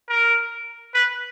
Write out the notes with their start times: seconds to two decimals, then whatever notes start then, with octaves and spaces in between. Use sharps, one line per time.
0.09 A#4
0.94 B4